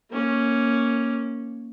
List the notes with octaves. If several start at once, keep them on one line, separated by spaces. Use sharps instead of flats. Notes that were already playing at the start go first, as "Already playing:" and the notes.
A#3 C#4